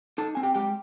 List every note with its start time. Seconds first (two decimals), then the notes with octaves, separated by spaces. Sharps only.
0.18 D#4 A4 A5
0.35 C4 G#5
0.43 G4 G5
0.55 G#3 G4 G5